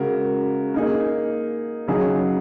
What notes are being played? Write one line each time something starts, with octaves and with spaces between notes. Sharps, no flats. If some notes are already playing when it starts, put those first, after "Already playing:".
Already playing: C#3 G#3 F#4 A#4
A#3 D#4 G#4
C#3 F#3 D#4 G#4 C#5